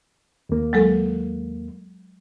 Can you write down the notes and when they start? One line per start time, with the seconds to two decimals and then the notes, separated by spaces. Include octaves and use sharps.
0.49 D#2 A#3
0.73 F#3 G#3 A4